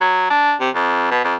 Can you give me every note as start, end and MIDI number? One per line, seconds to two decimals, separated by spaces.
0.01 0.26 54
0.30 0.54 62
0.61 0.69 48
0.75 1.07 41
1.11 1.21 47
1.24 1.35 41